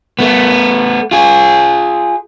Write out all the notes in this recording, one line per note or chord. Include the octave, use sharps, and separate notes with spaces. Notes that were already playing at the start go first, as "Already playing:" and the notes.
A3 B3
F4 G#4